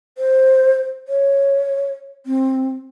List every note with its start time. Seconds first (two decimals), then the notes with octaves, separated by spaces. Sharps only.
0.18 C5
1.08 C#5
2.26 C4